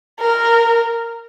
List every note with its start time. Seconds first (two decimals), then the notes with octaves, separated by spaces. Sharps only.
0.20 A#4